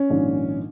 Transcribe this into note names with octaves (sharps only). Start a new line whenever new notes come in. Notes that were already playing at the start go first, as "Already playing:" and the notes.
Already playing: C#4
A#1 G#2 D#3